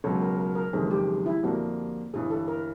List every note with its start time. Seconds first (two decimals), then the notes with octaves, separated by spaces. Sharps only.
0.04 C#2 B2 F#3 A4
0.21 A#4
0.38 A#4
0.55 A#4
0.73 F#1 F2 C3 D#3 G#3 G#4
0.91 G4
1.26 E4
1.43 F2 D3 G3 A#3 D4 F#4
2.14 G1 G2 E3 G#4
2.31 A4
2.48 A#4